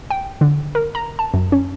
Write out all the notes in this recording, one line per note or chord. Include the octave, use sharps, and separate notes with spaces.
G5
D3
A#4
A#5
A5
F#2
C#4